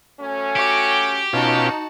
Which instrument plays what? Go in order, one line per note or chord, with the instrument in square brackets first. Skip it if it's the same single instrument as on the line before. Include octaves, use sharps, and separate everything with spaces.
[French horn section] F#3 A3 C#4
[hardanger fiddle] F#4 D6 [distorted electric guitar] G4
[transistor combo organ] B2 C#4 F4 [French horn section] D#4 [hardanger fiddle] F#4 A5